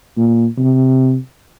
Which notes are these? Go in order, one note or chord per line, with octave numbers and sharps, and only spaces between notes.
A#2
C3